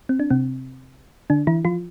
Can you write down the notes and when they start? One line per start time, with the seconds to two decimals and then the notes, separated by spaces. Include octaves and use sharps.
0.09 C4
0.20 D4
0.30 C3 C4
1.30 D3 D4
1.47 E3 E4
1.65 F3 F4